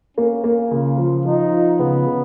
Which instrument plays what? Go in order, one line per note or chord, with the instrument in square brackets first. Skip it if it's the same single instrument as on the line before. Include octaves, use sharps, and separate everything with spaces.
[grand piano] A#3 [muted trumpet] C#4
[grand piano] A#3
[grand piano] C#3 [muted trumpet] F4
[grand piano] F3
[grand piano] F3 [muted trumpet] D#4
[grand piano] F4
[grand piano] C#3 [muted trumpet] B3
[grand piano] C#3